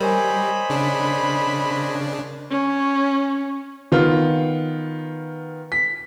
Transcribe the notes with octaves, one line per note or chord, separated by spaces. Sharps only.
G3 A#4 C5 C#5 D#5 G#5 B5
C#3 D4
C#4
D#3 B3 F4
B6